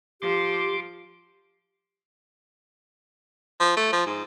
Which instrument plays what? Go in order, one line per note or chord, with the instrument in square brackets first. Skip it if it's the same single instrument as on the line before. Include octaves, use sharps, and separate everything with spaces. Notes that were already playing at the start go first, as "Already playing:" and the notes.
[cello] F3 [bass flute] G4 [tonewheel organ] C6 D6
[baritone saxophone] F3
A3
F3
G#2